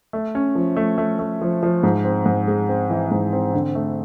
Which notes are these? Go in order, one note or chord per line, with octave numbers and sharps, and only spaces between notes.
A3
C#4
F3
A3
A3
A3
F3
F3
G#2
C4
G#2
G#3
C4
E3
G#2
C4
D3
A3